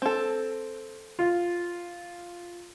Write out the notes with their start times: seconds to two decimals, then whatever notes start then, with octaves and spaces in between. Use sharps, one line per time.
0.02 C4 A4
1.19 F4